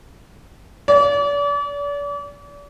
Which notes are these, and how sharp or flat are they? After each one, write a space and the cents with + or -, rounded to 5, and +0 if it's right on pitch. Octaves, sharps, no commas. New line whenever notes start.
D5 -40